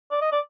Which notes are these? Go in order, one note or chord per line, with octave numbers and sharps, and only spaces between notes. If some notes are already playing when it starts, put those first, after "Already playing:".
D5
D#5
D5